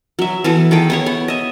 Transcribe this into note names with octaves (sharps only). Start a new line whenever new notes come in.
F#3 E5
E3 B3 E4 A4
D#3 G#4 A4 G5
B3 E4 C#5
B3
D#5 E5